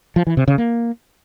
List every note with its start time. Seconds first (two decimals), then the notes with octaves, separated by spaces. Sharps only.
0.16 F3
0.27 E3
0.37 C3
0.48 C#3
0.58 A#3